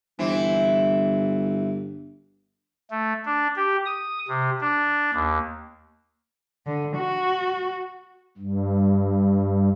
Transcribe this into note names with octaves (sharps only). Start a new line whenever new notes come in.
G1 E3 C4
A3
D4
G4
D#6
C3
D4
D#2
D3
F#4
G2